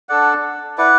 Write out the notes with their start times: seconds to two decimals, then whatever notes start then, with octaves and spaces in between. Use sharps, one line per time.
0.09 D4 A4 D5 F#5
0.78 E4 B4 D5 F#5